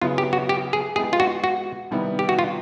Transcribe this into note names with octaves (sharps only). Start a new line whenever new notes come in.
C#3 F#3 B3 E4 F4
G4
F#4
G4
G#4
G#3 B3 E4 G4 G#4
F4
F#4
F#4
C3 D#3 G3 B3 E4
G4
F#4
F4